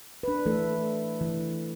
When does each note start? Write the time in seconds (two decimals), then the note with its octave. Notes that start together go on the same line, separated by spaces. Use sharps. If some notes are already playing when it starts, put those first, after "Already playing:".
0.23 D4 B4
0.46 E3 A3 A4
1.21 E3